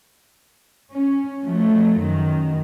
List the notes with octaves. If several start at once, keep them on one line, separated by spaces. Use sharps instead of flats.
C#4
F3 F#3 A3
F#2 D#3 F#3